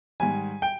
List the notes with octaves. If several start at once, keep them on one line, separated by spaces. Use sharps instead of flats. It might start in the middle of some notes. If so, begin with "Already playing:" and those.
G#2 D#3 G3 G#5
G5